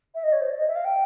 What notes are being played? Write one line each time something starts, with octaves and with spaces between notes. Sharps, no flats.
E5
D#5
C#5
C5
D5
D#5
E5
F5
G5